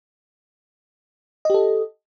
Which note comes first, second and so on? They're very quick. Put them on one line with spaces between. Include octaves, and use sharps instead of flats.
D#5 G4 A4